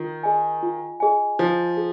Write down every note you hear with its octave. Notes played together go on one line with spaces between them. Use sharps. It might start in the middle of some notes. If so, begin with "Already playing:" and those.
Already playing: D#3 F4
G#4 D#5 G#5
F4
G#4 D#5 G#5
F3 F4
G#4